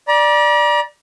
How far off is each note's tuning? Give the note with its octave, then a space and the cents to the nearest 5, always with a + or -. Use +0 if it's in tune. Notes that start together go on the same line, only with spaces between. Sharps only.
D5 +5 A#5 +45